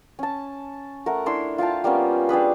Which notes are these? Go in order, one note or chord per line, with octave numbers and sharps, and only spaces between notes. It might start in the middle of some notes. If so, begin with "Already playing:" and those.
C#4 A5
A3 A#4 F#5
D4 E4 C6 E6
F4 F5 G5 A5
G3 A#3 B3 C#4
G3 D4 G#4 B4